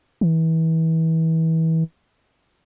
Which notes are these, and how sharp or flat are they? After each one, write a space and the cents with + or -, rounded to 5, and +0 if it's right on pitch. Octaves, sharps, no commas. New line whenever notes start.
E3 -30